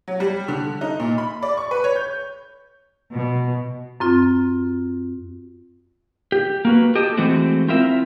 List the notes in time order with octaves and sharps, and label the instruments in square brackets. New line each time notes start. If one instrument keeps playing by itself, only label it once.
[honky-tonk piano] F#3
G3
D3
D#4
A#2
B5
D5
C#6
B4
C#5
G6
[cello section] B2
[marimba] F#2 C4 F4
[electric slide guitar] G4
A#3 F#4 B4
F#4 G4 A4 D#5
E3 G#3 A3 C4 F#4
C4 E4 F4 A#4 E5